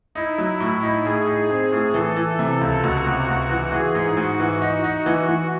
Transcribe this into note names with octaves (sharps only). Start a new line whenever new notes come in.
D#4 E4
F#3
A2
D#4
A2 G#4
D#4
C4
A2
E3 A4
E3
C3
C#2
C#2 F#4
C3
C#2
E3
E3 G#4
G#2
G#2 F#4
E3
D#4
D#4
E3
E3